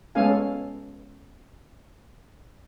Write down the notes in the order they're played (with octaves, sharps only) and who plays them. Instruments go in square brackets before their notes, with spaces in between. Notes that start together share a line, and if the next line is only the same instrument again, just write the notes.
[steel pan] G#3 B3 C#4 A4 F5 G#5